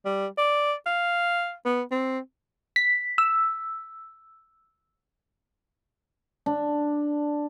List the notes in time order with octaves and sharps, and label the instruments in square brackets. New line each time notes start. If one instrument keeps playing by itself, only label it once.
[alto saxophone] G3
D5
F5
B3
C4
[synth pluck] B6
E6
[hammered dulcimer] D4